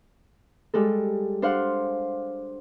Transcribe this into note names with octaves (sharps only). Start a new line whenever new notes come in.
G3 G#3 A4
D4 C5 F5 F#5